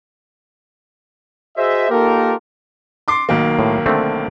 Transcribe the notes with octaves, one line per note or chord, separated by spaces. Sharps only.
F#4 G#4 C5 D#5 E5
A#3 D#4 F4 G4 A4 A#4
C6 D6 C7
B1 D#3 A#3
A2
D3 A3 C4